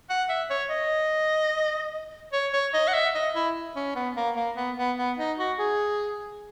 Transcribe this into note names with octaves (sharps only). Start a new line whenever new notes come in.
F#5
E5
C#5
D#5
C#5
C#5
D#5
F#5
E5
D#5
E4
C#4
B3
A#3
A#3
B3
B3
B3
D#4
F#4
G#4